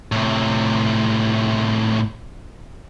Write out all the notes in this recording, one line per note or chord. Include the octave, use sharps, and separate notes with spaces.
A2 C3